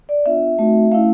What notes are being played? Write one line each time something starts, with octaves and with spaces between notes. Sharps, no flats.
D5
B3 D4 F4 E5
A3 C4 D#4 F#4
A3 C#4 E4 F5